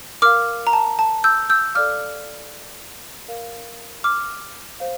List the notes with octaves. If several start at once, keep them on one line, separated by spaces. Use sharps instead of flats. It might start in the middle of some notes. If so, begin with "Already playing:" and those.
A#4 F5 D6 F6
A#5
A5
A5
E6 G6
E6 G6
A4 D5 F5 D6 F6
A#4 F5
D6 F6
C5 F5